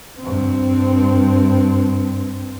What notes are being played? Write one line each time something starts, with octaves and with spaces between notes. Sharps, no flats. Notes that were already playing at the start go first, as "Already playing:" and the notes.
G2 C4